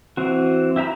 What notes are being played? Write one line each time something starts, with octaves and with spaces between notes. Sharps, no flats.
E3 C4 F#4
E4 G4 E5 A#5 B5